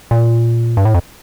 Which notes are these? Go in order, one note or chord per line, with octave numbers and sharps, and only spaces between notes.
A#2
G2
A2
F2